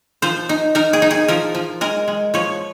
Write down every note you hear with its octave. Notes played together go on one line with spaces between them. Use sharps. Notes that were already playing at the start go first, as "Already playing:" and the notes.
F3 C5
D#4
D#4 A#4
G#4
D#4
G#4
F3 A#4
F3
G#3 A#4
G#3
F3 C#5